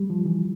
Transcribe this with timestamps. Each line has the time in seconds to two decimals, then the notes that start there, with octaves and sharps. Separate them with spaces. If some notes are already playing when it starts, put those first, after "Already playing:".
Already playing: G3
0.10 F3
0.26 E3